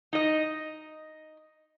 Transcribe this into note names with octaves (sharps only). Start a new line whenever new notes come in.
D#4 D#5